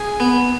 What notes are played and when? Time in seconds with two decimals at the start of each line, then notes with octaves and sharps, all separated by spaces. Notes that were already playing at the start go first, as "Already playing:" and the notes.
Already playing: G#4
0.20 B3